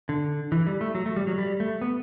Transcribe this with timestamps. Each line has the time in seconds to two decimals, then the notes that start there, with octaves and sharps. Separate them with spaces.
0.09 D3
0.52 E3
0.67 G3
0.81 A3
0.95 F#3
1.06 A3
1.16 G3
1.27 F#3
1.38 G3
1.60 A3
1.82 B3